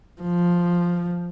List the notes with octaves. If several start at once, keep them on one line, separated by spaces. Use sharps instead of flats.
F3